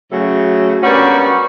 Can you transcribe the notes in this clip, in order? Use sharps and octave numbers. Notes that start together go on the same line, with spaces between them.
C#3 F#3 A3
G3 A#3 B3 C#4 D4 F#4